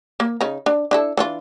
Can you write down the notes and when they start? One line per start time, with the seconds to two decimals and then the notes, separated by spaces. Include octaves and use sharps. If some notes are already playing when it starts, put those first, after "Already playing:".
0.20 A#3
0.41 C#3 D#4 A#5
0.66 D4
0.91 D4 E4 A4
1.17 E3 D4 F4